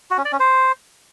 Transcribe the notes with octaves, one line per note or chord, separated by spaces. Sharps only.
F#4
C#4
D5
C#4
C5